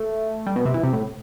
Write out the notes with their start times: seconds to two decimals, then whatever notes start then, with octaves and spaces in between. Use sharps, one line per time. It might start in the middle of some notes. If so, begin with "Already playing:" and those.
Already playing: A3
0.47 G3
0.56 B2
0.65 C3
0.74 E3
0.83 C3
0.93 A2